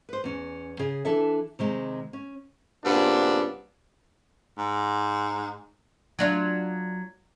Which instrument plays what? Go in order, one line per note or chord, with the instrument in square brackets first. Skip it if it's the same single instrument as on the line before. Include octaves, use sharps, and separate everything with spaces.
[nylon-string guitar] B4 C5
E2 C#4
C#3 G#4
E3 D4 A4 E5
C3 D#3 G#3
C#4
[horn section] G2 A#2 C#3 B3 C4 D4
[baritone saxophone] G#2
[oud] F#3 D4 F4